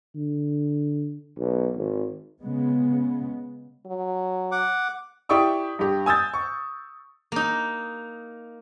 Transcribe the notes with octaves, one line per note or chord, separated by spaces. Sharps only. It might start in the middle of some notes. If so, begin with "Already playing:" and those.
D3
B1
G#1
C#3 G#3 B3
F#3
F#5 D6
E4 G4 D5 G5 C#6 D#6
G2 G4
G#5 D#6 E6 G6 A6
C#6
A#3 D#4